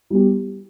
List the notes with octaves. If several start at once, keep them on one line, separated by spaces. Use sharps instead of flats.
G3 B3 G4